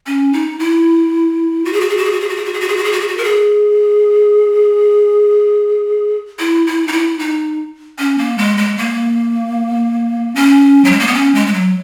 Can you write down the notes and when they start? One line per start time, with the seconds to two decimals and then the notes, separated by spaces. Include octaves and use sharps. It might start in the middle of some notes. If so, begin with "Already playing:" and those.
0.06 C#4
0.33 D#4
0.59 E4
1.65 F#4
1.73 G#4
1.81 F#4
1.89 G#4
1.97 F#4
2.05 G#4
2.12 F#4
2.20 G#4
2.29 F#4
2.36 G#4
2.45 F#4
2.53 G#4
2.60 F#4
2.68 G#4
2.77 F#4
2.84 G#4
2.92 F#4
3.01 G#4
3.08 F#4
3.17 A#4
3.24 G#4
6.39 E4
6.67 E4
6.87 D#4
6.92 E4
7.19 D#4
7.98 C#4
8.18 A#3
8.38 G#3
8.57 G#3
8.78 A#3
10.35 C#4
10.85 F#3
10.91 G#3
10.99 A#3
11.07 B3
11.14 C#4
11.35 G#3
11.47 G#3
11.53 F#3